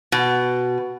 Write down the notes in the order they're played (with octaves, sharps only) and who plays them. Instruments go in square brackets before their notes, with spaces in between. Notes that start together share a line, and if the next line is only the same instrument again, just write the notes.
[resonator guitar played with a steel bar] B2